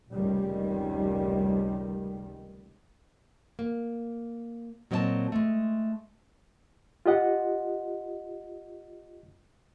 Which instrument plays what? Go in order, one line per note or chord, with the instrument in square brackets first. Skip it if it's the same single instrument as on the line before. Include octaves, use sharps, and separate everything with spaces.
[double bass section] F1 C#2 D#3 G3
[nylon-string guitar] A#3
A#2 F#3 C4 D5 D#5 A5
G#3 A3
[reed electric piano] F4 G4 D#5 F#5